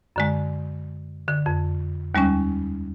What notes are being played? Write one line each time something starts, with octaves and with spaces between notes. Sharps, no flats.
F#2 D3 G#3
D3
F2
D#2 G3 G#3 C#4